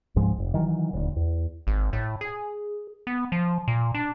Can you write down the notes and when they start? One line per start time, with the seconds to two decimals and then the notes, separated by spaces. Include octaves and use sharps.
0.16 C#2 G#2 F3 G#3
0.38 F1
0.54 D#3 E3 F#3
0.93 D#1 D2
1.16 E2
1.67 G#1
1.93 A2
2.21 G#4
3.07 B3
3.32 F3
3.68 A#2
3.94 D4